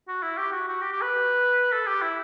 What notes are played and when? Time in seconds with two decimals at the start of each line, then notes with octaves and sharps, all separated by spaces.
0.08 F#4
0.23 E4
0.37 G4
0.52 F#4
0.68 F#4
0.82 G4
0.92 G4
1.02 B4
1.72 A4
1.87 G4
2.02 E4